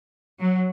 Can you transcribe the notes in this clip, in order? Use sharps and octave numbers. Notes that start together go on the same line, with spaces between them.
F#3